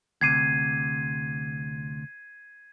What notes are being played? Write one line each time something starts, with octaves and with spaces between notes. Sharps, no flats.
D2 C3 G#6 C7 D#7